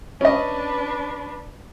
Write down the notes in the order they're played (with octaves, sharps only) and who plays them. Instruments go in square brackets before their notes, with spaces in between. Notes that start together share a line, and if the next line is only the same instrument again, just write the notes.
[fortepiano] C#4 D#5 [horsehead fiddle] D4 B4